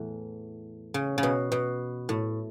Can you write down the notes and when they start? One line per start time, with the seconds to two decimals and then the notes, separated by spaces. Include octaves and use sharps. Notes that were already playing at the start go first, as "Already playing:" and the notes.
Already playing: E2 A2 E3 A3
0.94 C#3
1.18 C#3
1.23 B2
1.52 B2
2.09 A2